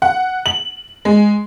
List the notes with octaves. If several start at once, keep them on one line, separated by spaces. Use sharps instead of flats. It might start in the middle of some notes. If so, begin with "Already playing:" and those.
F#5
F#7
G#3